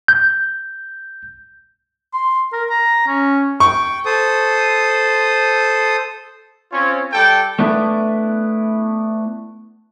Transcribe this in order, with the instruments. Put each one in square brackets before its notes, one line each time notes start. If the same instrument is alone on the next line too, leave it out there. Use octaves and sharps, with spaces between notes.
[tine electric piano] G6
[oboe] C6
A#4
A#5
C#4
[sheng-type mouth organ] G5 [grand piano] C#6
[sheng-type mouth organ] A4 C5 D#6
[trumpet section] C4 C#4 F4 C#5
G3 A4 G5
[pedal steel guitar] A3 B3 D4 E4